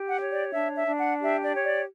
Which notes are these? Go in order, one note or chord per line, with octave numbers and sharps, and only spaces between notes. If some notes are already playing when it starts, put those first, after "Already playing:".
Already playing: G4
F#5
C#5
D5
D4 E5
E5
D4
F#5
G4 E5
D5
C#5
D5